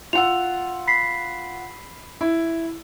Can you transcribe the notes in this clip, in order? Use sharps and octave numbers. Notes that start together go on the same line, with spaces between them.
F4 F#5 E6 F7
B5 B6 C7
E4